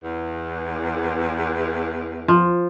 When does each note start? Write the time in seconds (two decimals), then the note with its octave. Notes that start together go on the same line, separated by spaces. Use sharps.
0.04 E2
2.28 F3